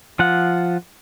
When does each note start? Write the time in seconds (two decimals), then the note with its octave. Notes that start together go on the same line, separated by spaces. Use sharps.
0.19 F3 F4 F#5